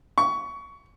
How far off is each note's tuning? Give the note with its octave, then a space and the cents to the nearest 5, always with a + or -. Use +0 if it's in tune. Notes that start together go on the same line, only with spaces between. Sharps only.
C#6 +20